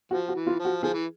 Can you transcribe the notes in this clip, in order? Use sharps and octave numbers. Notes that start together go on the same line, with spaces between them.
F3 F#4
F#4
E3
F4
F3
F#4
F3 G#4
E3